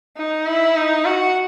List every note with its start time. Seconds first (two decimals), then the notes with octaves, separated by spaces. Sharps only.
0.17 D#4
0.46 E4
0.76 D#4
1.05 F#4